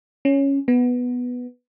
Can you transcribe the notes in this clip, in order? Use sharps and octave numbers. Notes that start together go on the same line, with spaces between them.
C#4
B3